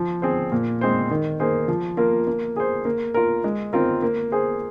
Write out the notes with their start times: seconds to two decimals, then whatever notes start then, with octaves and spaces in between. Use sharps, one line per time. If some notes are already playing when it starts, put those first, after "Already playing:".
Already playing: F3
0.22 C4 G#4 C5
0.52 A#2
0.81 G#3 C4 G#4 C5
1.11 D#3
1.40 A#3 G#4 C5
1.68 F3
1.97 A#3 F4 A#4
2.27 A#3
2.56 G#4 C5
2.85 A#3
3.14 F4 A#4
3.44 G#3
3.73 C4 F4 A#4
4.02 A#3
4.32 G#4 C5